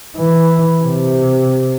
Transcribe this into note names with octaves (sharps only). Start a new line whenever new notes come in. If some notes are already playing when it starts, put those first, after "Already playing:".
E3
C3